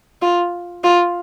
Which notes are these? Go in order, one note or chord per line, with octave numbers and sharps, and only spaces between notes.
F4
F4